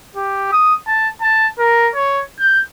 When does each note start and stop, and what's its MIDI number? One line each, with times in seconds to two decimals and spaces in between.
0.16 0.49 67
0.52 0.74 87
0.87 1.08 81
1.22 1.47 81
1.59 1.90 70
1.95 2.22 73
2.40 2.61 91